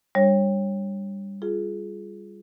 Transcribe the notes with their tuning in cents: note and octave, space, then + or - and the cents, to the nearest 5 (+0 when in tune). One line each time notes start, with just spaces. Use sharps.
G3 +15 D4 +0 C#5 -20
F4 +0 G#4 +20